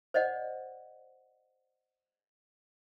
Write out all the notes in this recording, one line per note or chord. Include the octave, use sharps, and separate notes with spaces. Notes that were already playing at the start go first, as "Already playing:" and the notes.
C5 D5 D#5 F#5